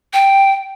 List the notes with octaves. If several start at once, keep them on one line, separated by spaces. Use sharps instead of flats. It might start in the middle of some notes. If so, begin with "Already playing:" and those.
G5